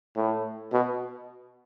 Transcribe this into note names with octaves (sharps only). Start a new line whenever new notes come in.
A2
B2